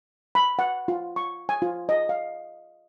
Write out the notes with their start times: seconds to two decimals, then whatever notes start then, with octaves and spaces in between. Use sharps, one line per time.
0.35 B5
0.59 F#5
0.88 F4
1.16 C#6
1.49 G#5
1.62 F4
1.89 D#5
2.09 F5